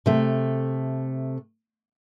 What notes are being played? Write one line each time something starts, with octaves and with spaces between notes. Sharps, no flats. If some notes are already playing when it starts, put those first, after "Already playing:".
C3 A3 A4